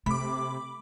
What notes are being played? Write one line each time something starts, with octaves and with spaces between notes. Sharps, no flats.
C3 A3 B5 D6